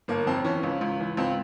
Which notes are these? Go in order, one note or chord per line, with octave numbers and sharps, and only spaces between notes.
G1 A#3
F2 C4
E3 C#4
C#2
C#2
E3
C#2 C4